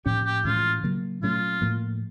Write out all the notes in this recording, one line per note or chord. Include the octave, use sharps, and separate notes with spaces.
A2 F3 A#3 C#4 G4
G4
A2 E3 G#3 C#4 F4
C#3 F#3 A#3
A#2 F#3 A3 C#4 F4
A2 F3 A#3